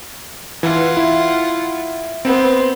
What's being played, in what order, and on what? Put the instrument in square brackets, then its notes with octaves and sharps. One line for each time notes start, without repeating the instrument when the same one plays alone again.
[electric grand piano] E3 [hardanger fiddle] F4 F#5
[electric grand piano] E4
[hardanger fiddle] B3 C5 [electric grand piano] C4